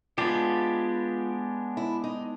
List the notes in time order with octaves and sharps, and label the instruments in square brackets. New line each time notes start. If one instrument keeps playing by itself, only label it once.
[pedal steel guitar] G#3 B3 D4 G4 [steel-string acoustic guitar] F4
[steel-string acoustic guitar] E4
D#4